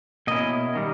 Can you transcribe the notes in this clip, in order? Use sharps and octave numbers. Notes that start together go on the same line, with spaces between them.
B2 A#3 C#4 E4 D#5
D#3 G3